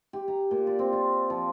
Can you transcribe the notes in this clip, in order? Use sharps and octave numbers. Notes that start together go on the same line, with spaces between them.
G4
A#5
A#2
D5
C4
F4
F3